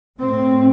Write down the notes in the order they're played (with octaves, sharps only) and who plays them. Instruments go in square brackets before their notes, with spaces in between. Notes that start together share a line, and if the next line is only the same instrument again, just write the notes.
[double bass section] A2 C4